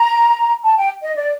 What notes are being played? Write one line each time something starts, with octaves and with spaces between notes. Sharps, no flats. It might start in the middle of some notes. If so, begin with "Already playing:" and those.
Already playing: A#5
A5
G5
D#5
D5